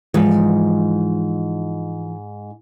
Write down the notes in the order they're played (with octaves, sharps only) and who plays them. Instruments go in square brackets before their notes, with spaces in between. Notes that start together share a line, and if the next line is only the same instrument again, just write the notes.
[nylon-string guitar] G#2 [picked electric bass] E3 F3